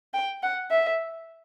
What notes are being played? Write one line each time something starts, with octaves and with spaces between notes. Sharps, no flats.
G5
F#5
E5